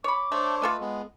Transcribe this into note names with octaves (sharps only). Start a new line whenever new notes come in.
C#5 B5 D6
A3 D4 C5 C#5
A3 F4 A4 B4 D#5
G#3 B3